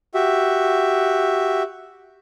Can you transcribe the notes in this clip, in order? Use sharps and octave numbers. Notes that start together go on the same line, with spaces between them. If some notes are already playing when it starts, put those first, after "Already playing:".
F#4 G4 E5